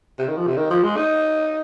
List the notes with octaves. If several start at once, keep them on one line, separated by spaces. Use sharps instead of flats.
C3
D#3
F3
C3
D#3
F3
G#3
D#4